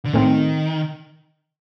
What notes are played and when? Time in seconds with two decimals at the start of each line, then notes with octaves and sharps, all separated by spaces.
0.06 D3
0.14 A2 D#3 A3 C4